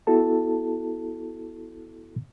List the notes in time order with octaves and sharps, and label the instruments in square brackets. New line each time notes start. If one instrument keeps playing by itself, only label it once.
[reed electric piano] B3 E4 F#4 A4 A5